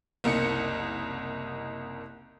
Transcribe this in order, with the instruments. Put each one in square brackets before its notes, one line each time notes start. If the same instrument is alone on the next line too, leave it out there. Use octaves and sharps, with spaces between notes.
[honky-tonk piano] F#1 C2 A#3 D#4 C#7